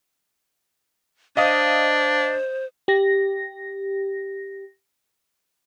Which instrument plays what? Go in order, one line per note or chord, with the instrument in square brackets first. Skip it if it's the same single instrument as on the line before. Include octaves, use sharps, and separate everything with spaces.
[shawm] D4 [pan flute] C5 [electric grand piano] D#5 F5 D#6
[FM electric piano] G4 A#6